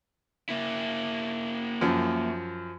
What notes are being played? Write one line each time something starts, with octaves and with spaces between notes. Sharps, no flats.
A#3 E4
F#2 F3